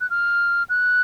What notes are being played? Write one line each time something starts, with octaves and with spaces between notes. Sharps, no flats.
F#6
F6
F#6